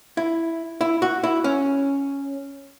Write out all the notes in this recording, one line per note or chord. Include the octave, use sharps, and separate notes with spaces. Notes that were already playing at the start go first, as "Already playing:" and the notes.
E4
E4
F#4
E4
C#4